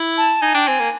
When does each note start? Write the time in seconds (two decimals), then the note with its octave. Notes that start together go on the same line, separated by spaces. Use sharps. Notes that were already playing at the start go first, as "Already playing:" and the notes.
Already playing: E4
0.18 A5
0.41 D#4 G#5
0.54 D4 G5
0.68 C4 G#5
0.80 A#3